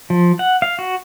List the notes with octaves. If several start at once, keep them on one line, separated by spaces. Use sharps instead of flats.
F3
F#5
F5
F#4